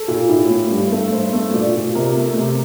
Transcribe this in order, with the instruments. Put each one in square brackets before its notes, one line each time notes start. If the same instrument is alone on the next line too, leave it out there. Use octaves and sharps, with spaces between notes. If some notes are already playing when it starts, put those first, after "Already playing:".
Already playing: [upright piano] A4
A#2
A2
A3
G2 G4
A3 A4
G2 C5
A3
A#2 D5
A#2
C3 A#4
A3
C3